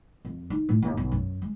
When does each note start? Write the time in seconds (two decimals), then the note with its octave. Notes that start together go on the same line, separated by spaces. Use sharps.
0.25 F2
0.50 D#4
0.69 A2
0.82 D#2
0.97 B1
1.12 F#2
1.42 G#3